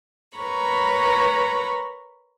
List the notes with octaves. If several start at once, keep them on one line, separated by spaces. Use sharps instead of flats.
A#4 B4 C#5 A#5 B5 C#6